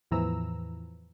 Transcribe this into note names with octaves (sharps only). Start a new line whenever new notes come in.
E2 A2 E3 F3 A#5 E6